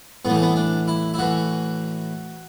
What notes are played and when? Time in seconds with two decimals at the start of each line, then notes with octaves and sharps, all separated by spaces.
0.25 A2 B3
0.30 E3 A3
0.42 B3
0.56 D4
0.88 E4
1.14 E4
1.18 A2 E3 F#4